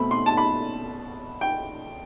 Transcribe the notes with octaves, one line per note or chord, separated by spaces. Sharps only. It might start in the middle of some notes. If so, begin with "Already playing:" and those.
Already playing: B2 A3 C4 B5
C6
A5
B5
G5